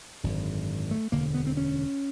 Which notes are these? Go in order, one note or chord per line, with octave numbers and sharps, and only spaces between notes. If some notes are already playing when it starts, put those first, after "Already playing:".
G#1 F#2 D3
A3
E1 D2 D3 A#3
B3
C4
C#4